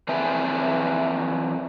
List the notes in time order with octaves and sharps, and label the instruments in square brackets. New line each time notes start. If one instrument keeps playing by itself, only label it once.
[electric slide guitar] F2 E3 C4 B4 E5 G#5